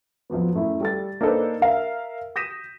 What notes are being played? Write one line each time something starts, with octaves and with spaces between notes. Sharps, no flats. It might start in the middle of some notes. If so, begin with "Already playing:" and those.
F2 F3 F#3 B3
F#2 A3 E4
G3 A4 A6
A#3 D4 D#4 A4 B4 C5
A#4 E5 F5
D#6 G6 A#6 B6 D#7 E7